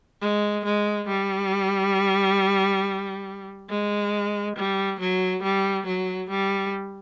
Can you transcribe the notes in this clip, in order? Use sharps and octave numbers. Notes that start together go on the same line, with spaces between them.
G#3
G#3
G3
G#3
G3
F#3
G3
F#3
G3